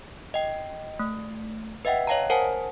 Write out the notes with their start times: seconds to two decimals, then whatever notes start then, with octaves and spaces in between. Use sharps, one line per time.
0.34 D#5 G5
0.99 A3
1.85 B4 D#5 E5 F#5 G5
2.07 C#5 D#5 F5 G5 A5 A#5
2.30 A#4 C5 F#5 G#5 A5